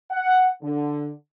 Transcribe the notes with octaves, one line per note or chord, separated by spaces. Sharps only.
F#5
D3